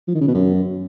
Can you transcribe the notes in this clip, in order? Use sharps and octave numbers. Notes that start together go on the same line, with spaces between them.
F3
D#3
C#3
B2
F#2